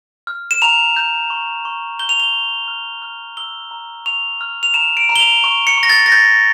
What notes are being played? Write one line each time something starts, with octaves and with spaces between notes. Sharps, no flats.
F6
E7
A#5 F7
G6
C#6
C#6
G6 G7
F7
G7
C#6
F6
F6
E6 G7
A#5
C#6 F7
F6
F7
A#5 E7
D7
A#5
G7
F7
C#6
C#7
C#6
A#6
A6
A#6
G6 A6